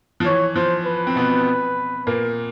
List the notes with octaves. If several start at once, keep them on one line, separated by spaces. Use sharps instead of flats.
F3
E3 C#5
F3 C5
B4
C4
B2 B3
A#2 A#3